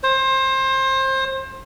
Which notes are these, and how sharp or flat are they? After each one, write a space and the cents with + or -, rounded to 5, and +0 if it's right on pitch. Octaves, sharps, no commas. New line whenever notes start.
C5 +25